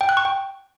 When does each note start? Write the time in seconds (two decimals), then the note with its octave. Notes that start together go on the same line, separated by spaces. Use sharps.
0.01 G5
0.09 F#6
0.17 C#6
0.25 G5